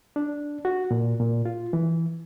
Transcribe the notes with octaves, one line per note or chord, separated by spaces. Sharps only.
D4
F#4
A#2
A#2
F4
E3